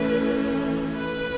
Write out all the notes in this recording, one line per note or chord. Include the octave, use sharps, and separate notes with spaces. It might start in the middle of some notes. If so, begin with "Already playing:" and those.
Already playing: E3 A3 C#4 B4
B4